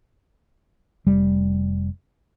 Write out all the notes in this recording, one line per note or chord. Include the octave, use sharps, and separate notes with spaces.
F1 G3